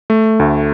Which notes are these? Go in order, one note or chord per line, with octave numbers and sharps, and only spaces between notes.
A3
D2